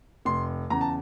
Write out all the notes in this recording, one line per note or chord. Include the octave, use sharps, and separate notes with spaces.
F1 C6
E2 C#3 A#5
A5